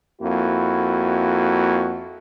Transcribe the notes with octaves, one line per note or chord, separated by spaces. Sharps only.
F2 A#3 E4 F#4